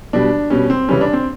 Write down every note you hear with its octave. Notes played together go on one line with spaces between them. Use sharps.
B2 G3 D4
B2 G3 C#4
C4
C#3 E3 G3 C#4
D4
C4